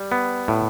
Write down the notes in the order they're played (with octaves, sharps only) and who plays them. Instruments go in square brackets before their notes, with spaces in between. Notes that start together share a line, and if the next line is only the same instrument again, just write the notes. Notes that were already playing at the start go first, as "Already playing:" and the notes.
Already playing: [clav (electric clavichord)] G3
B3
A2